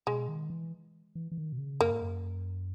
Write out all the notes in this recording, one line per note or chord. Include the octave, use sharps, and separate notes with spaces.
B2 G#3
D#3
E3
E3
E3
D#3
B2
C#3
F#2 A#3
G#2
F#2